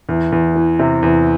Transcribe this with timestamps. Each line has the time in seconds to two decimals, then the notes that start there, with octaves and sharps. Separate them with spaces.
0.09 E2
0.32 E2
0.56 E3
0.79 C3
1.02 E2